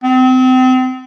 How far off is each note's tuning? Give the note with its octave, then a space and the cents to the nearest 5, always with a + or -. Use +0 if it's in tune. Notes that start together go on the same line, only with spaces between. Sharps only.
C4 -30